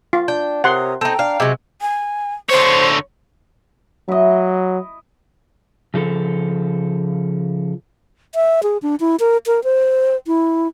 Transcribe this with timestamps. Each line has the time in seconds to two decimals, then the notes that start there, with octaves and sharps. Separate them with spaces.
0.13 F4
0.28 D4 G5
0.64 C3 A#4 C#5 F#5 C6 D#6
1.01 C4 D#4 A4 G5 A#5
1.19 D4 F5
1.40 C3 F#3 G#3
1.81 G#5
2.50 D3 C5 C#5
4.08 F#3 E4 D#5
5.94 C#3 F3 A4
8.35 E5
8.63 G#4
8.82 D4
9.00 E4
9.20 A#4
9.46 A#4
9.64 C5
10.27 E4